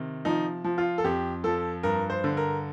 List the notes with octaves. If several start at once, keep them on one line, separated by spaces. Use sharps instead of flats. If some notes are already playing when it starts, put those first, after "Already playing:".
Already playing: C3 D#3
F3 D#4
F3
F4
A4
F2 G4
F3 A4
G2 A#4
C5
D3
A#4